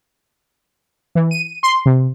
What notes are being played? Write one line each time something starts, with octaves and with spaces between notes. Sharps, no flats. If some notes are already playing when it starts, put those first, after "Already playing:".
E3
D#7
C6
C3